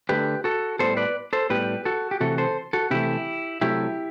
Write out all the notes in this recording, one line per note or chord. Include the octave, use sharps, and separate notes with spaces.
D3 A3 G4 B4
F#4 A4
A2 G3 B3 A4 C5
B4 D5
A4 C5
A2 G3 B3 G4 B4
F#4 A4
G4
C3 E3 A3 F#4 A4
A4 C5
F#4 A4
C3 E3 A3 E4 G4
C3 F#3 A3 E4 G4